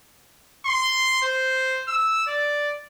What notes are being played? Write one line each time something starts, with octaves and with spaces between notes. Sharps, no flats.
C6
C5
E6
D5